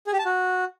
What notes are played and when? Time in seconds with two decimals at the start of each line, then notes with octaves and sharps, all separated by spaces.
0.07 G#4
0.13 G4
0.19 A5
0.25 F#4